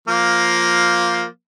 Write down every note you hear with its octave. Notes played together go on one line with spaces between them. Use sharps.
F3 A#3